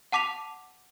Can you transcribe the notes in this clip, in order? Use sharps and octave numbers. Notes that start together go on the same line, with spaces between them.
F#5 A5 D6 B6 F7